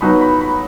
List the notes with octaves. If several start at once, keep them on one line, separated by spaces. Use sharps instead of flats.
F#3 B3 D#4 B5
B5
B5